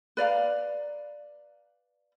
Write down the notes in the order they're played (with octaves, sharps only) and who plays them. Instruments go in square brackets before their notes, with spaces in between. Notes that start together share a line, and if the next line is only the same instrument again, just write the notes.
[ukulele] B4 D5 F5 A#5